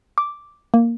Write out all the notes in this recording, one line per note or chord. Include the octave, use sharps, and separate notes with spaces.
D6
A#3